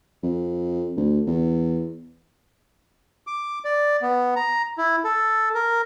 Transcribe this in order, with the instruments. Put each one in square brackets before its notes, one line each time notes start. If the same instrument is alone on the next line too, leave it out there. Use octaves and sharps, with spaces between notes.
[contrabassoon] F2
D2
E2
[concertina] D6
D5
B3
A#5
E4
A4
A#4